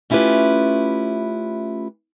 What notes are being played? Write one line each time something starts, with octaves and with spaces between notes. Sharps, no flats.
A3 C#4 E4 F4 G4 B4